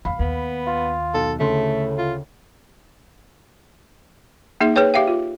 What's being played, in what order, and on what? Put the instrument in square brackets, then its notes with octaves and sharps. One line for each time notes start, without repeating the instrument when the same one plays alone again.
[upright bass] E2 C4 [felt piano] F5 B5
[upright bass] D#2 [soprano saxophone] B3
[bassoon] F4
[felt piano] B1 [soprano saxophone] A4
[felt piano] D2 C#3 C6 [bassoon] A2 [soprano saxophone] A3
[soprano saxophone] F4
[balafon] A#3 D#4 G#4 E5
G#4 B4 C#5 G5
G4 E5 F5 G5
F4